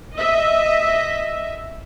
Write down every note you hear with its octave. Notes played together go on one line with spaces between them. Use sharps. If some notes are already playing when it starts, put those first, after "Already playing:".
D#5 E5